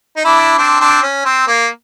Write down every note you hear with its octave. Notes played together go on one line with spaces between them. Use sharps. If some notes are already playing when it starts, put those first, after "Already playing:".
D#4
D4 E4
C4 D4
C4 D4
C#4
C4
A#3